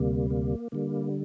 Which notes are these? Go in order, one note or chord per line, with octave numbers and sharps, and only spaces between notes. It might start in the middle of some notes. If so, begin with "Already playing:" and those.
Already playing: D2 C3 G3 A#3
A#3
D3 G3 A#3